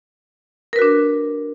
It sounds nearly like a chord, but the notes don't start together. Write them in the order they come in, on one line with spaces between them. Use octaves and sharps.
A#4 B4 F#4 D4